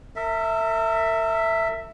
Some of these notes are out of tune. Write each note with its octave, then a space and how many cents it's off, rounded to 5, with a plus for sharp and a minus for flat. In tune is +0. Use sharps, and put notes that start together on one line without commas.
A#4 -45 E5 +0